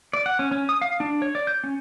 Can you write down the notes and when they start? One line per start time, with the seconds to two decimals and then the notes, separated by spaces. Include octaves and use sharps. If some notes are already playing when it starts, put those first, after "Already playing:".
0.13 D5
0.26 F#5
0.39 C#4
0.51 C#4
0.69 D#6
0.81 F5
1.00 D4
1.22 C#5
1.35 D5
1.47 G6
1.64 C#4